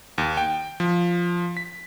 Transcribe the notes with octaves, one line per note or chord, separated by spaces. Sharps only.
D#2
G5
F3
B6